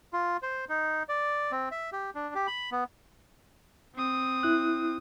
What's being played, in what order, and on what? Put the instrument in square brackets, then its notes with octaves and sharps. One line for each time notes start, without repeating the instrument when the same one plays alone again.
[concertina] F4
C5
D#4
D5
C4
E5
G4
D4
G4
B5
B3
[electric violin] C4 D#6
[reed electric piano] E4 F#6